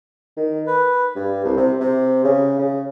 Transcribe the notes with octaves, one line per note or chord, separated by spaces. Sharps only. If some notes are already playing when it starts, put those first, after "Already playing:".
D#3
B4
G2
C2
C3
C3
C#3
C#3